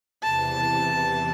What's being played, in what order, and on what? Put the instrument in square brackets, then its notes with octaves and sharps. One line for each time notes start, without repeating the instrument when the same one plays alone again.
[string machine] E2 C3 E3 [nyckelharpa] A5